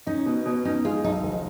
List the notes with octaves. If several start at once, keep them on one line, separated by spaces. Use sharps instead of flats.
C#4 D#4
B2
B2
C#4 D#4
G#3 F4
B1 D#4
F1